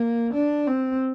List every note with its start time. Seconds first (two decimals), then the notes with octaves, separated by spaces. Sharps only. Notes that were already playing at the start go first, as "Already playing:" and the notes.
Already playing: A#3
0.34 D4
0.67 C4